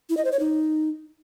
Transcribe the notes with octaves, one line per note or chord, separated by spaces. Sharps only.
E4
D#5
C5
C#5
D#4